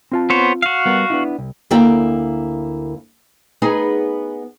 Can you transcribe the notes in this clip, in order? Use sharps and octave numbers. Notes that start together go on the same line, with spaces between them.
C4 F4 A5
B3 C5 C#5
F#4 F5
G3 B3 A#4
B3 D4 E4
C2
D2 A#3 E4 D5 G5
B3 D#4 G#4